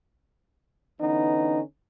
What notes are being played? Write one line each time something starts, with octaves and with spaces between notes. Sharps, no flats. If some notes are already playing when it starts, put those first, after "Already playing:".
D3 E3 B3 C#4 D#4